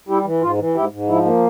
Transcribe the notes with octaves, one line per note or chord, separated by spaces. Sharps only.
G3 E4 G4
E3
G#2 F4
E3
G#2 E4 G4
G#2
F3 E4
A#3